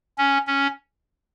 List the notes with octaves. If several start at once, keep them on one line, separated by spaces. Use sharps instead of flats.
C#4
C#4